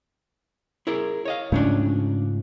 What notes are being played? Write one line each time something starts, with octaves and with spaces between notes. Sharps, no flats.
E4 G#4 A#4
C#5 D#5 F5
G#2 C#3 F3 A3 C#4 D4